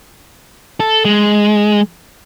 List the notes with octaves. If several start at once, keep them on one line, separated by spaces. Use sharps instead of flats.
A4
G#3